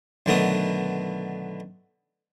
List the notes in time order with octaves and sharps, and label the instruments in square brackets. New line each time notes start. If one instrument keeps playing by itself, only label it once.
[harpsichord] B1 D3 D#3 A3 B3 D#6